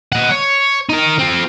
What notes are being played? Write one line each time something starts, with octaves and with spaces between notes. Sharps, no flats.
D#5 F#5
C#5
D#4 A#4
C4 F4